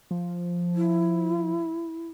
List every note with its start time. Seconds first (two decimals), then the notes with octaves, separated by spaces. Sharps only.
0.11 F3
0.75 E4